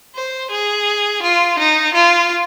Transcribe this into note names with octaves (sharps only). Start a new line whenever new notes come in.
C5
G#4
F4
D#4
F4